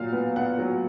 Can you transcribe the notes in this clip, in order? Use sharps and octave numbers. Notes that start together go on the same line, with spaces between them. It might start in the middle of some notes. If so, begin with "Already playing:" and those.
Already playing: A#2 F#3 F5
B3
B3 F#5
F#3